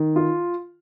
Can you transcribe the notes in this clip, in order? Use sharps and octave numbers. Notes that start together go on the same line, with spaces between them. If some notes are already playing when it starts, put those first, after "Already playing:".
Already playing: D#3
F4